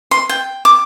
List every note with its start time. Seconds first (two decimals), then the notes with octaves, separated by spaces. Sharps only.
0.11 C6
0.29 G5
0.65 D6